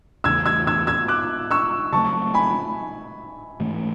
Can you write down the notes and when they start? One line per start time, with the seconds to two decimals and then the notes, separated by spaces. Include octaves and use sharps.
0.24 E2 C#3 E3 A3 E6 G#6
0.46 E6 G#6
0.67 E6 G#6
0.87 E6 G#6
1.08 D6 F#6
1.51 C#6 E6
1.92 C#3 F#3 A3 A5 C#6
2.34 G#5 B5
3.60 G#2 E3 A3